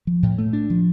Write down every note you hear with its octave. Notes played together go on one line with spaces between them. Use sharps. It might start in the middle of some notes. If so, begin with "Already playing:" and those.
F3
A2
A3
D4
F3